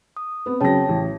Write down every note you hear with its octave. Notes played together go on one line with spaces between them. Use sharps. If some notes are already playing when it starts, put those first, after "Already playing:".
D#6
B3 C4
C#3 F#3 C#5 G5 A5 A#6
A1